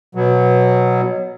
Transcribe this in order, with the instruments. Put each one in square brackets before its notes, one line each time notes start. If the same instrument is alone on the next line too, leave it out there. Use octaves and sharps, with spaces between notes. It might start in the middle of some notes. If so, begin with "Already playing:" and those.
[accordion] B2 F#3